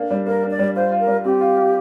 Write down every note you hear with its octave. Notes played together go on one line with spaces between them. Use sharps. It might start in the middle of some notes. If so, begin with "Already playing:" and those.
Already playing: A#3 D4
G3
A#3 A#4
D4
D5
G3
F4 C5
F4
A#4
G3
C4 G4
F4
F4